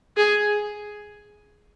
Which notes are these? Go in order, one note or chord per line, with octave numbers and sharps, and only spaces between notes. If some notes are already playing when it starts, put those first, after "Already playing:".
G#4